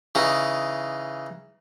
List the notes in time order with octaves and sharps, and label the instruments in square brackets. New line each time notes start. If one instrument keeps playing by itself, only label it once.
[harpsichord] C#3 E3 D#4